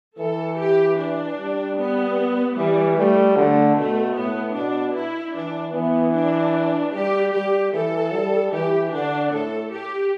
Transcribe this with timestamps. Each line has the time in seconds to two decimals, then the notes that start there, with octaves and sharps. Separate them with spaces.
0.19 E3 A4
0.59 G4
0.98 D4
1.38 G3
1.78 B3
2.57 E3 G3
2.96 G3 A3
3.36 D3 A3
3.76 B2 A3
4.15 A2 B3
4.55 B2 D4
4.95 E4
5.35 E3 D4
5.74 E3 B3
6.14 D4
6.93 G3 G4
7.33 G3 G4
7.73 E3 A4
8.12 G3
8.52 E3 G4
8.91 D3 D4
9.31 A2 A4
9.71 G4